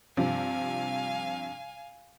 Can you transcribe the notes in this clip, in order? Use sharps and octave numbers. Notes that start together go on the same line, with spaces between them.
G2 C3 F3 F5 G#5